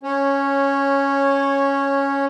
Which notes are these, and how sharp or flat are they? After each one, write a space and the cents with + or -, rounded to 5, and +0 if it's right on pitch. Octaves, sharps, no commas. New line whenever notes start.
C#4 +0 C#5 -10